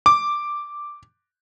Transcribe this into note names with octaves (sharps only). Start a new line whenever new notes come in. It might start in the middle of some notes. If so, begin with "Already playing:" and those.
D6